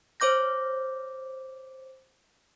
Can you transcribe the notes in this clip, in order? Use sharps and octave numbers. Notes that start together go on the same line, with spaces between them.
C5 C#5 D6 G6 A#6